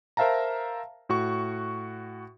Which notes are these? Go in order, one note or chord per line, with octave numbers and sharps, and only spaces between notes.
A#4 C5 E5 F5 A5 A#5
A2 F#4 C#6